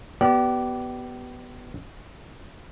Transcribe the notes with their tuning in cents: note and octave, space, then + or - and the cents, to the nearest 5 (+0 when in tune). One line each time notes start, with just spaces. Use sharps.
B3 +0 G4 -35 D5 +0